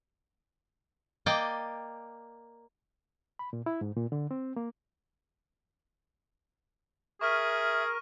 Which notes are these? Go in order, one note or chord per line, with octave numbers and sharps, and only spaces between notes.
A#3 D5 D#5 G5
B5
A#2
E4
G#2
A#2
D3
C4
A#3
G#4 A#4 E5 C#6 F6 D#7